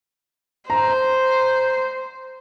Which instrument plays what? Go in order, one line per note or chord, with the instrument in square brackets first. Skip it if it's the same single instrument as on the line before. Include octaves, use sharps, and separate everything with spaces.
[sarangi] C5 [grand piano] A#5